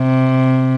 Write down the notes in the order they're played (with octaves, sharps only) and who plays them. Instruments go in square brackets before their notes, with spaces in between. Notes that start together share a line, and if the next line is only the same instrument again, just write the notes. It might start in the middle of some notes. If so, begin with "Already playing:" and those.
Already playing: [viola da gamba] C3